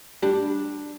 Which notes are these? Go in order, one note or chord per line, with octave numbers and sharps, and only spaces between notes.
G3 D4